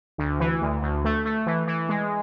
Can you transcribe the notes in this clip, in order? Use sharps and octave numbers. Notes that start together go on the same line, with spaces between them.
D2
E3
D2
D2
A3
A3
E3
E3
G#3